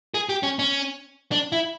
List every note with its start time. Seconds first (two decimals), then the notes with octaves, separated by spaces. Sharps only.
0.14 G#4
0.29 G4
0.43 C#4
0.59 C#4
1.32 D4
1.52 E4